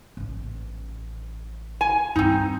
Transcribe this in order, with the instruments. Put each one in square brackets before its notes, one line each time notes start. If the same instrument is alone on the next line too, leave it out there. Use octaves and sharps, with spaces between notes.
[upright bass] A1 C#4
[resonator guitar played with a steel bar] G#5
[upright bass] G2 D#3 [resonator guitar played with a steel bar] C4 D#4